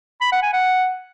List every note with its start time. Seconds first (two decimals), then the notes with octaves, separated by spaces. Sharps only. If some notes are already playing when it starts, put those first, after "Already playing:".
0.21 B5
0.32 F#5
0.43 G#5
0.53 F#5